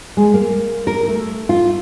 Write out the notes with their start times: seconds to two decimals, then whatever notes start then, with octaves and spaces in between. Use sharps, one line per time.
0.17 G#3
0.34 A#3
0.87 A#4
1.08 A3
1.49 F4